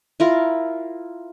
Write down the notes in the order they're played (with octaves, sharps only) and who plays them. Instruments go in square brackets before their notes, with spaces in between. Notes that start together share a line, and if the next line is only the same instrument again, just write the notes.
[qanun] E4 F4 A#4